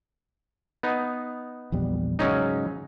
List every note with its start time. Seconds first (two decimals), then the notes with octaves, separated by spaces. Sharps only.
0.83 B3 D#4
1.72 A#1 E2 G3
2.19 G#2 C#3 F#3 C#4 D#4